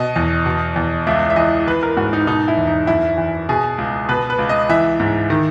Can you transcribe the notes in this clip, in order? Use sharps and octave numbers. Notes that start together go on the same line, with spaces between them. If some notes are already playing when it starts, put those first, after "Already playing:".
Already playing: B2 D#5
E2
B2
E2
C#2 E5
E5
E3 D#5
E3 B4
A#4
G#2 F#4
D#4
B2 D#4
E4
E2
D#4
F#2 E4
E3
B2 G#4
C#2
B2 B4
B4
C#2
D#5
E3 E5
G#2
D#3